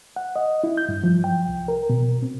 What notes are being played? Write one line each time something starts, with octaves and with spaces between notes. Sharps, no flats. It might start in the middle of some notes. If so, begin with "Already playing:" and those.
F#5
D#5
E4
G6
G2
F3
G5
C2
A#4
B2
C4